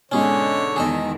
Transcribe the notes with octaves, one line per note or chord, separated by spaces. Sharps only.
G#2 B2 D3 C#4 G#4 C#5
E2 D#3 G#4 A4 D#5